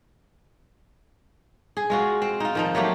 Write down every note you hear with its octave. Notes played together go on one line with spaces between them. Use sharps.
G#4
G#3 F4 F#4
C4
D#4 F4
D#3 F3 D#4
F#3 A3 A#3 G4